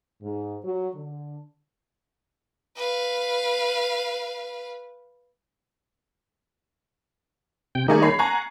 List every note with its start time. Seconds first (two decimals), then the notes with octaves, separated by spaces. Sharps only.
0.22 G#2
0.64 F#3
0.94 D3
2.76 B4 F5
7.75 C3 G5
7.88 D#3 G3 A3 A#3 D#4 G#4
8.02 C#5 B5 C7
8.19 F#5 G#5 A#5 C#6